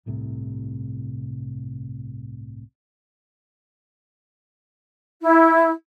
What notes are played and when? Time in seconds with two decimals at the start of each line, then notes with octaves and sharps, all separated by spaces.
0.06 G1 C2 A2 C3
5.21 E4